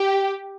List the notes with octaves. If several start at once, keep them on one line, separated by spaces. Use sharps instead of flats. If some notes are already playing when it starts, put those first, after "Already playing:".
Already playing: G4